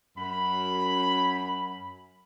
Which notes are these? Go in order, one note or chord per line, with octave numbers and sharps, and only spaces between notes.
F#2 B5